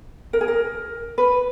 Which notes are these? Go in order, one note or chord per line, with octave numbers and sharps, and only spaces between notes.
A#4
G#4
A#4
B4